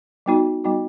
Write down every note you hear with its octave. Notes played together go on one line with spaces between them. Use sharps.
G3 B3 D#4 F#4
G3 B3 D#4 F#4